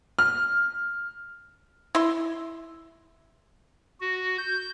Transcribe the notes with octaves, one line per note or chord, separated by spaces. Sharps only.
F6
E4 C6
F#4
G6